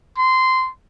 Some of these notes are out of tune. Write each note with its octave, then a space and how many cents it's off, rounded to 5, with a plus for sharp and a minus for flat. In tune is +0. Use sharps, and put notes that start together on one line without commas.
C6 -15